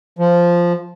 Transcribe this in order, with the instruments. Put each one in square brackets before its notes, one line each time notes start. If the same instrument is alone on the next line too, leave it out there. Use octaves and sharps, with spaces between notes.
[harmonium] F3